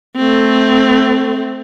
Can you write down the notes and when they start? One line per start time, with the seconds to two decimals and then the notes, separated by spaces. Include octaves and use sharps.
0.16 A3 C4